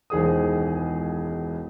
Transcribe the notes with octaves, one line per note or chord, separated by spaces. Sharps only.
E1 C#2 D#3 G#4 C5 D#6